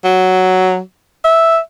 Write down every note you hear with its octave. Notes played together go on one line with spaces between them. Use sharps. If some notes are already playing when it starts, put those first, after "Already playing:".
F#3
E5